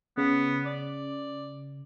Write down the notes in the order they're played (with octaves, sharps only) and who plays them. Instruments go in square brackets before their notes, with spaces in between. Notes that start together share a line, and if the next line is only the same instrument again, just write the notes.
[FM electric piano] C#3 [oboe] B3
[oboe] D5